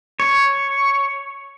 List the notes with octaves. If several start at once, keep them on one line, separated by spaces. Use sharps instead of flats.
C#5